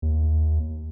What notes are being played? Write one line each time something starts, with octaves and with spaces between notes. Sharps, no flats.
D#2